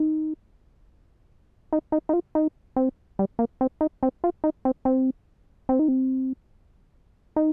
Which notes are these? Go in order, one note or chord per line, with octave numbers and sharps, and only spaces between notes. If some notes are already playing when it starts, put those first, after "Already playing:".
Already playing: D#4
D#4
D#4
D#4
F4
D#4
C4
G3
A#3
C4
D#4
C4
F4
D#4
C4
C4
C4
D#4
C4
D#4